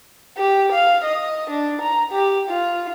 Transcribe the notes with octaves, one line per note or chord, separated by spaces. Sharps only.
G4
F5
D#5
D4
A#5
G4
F4